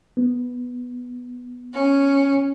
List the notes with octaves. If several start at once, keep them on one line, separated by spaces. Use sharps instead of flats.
B3
C#4